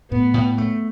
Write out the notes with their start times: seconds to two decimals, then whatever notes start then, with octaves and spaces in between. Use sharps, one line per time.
0.10 A2 B3
0.34 A2
0.58 A3